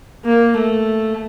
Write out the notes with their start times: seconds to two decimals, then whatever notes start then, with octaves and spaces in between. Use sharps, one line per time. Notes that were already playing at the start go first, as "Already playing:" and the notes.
0.25 A#3
0.58 A3